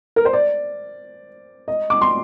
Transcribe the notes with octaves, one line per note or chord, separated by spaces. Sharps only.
A#4
C5
D5
D#5
D6
C6